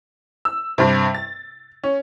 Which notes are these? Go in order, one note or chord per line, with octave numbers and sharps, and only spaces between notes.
E6
G2 C3
A6
C#4